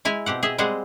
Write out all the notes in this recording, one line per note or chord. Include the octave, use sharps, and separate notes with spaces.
G#3 E4 G#5 A#5
B2 C4 G4 F#5
G#4 D#5 E5
G3 G#3 C4 G#4 D#5 F#5